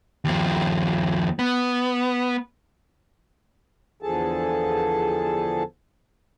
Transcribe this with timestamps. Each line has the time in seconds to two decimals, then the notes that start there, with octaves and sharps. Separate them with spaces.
0.25 D#2 F3
1.39 B3
4.02 E2 D3 F3 G#4 A4 A5